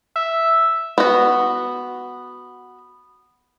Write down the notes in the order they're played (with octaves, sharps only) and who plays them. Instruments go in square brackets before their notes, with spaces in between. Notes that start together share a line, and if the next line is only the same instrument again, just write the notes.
[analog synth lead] E5
[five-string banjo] B3 F#4